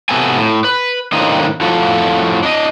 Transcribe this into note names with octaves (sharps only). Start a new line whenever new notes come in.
C3 B3 F#4 A4 G#5
A2
B4
A2 D#3 A#3 C4 D4 D#5
F2 A2 F3 F4 F#4 A4
D4 D#5